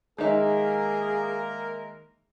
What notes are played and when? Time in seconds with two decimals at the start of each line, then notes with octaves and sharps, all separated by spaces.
0.18 D#3 G#3 A#3 D#4 G#4 A#4 E5